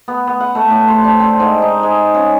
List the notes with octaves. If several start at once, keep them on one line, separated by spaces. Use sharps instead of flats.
B3
B3
F#5
A3
A2
C5
D4
C4
G#2
D#4
G#3
C#3